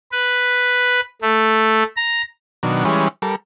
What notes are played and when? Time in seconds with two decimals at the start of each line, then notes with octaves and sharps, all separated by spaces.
0.12 B4
1.22 A3
1.97 A#5
2.63 B2 D#3 F#3 D4
2.85 E3 G3 G#3 C#4
3.22 G3 A4 A#4